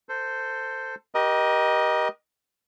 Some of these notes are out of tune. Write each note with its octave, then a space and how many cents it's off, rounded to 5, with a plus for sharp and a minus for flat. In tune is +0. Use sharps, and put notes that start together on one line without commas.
A4 +20 C5 -5
G4 -10 A#4 +35 D#5 +0